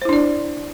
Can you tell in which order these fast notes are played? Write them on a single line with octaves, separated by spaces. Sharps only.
C5 E4 D4 D5